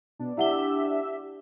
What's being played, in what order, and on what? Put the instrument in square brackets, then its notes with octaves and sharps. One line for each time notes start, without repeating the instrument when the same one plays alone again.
[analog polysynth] B2 [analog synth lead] D4
[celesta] E4 F#5 G7 [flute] G4 [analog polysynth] E5